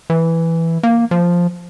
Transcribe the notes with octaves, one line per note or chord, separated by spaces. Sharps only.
E3
A#3
F3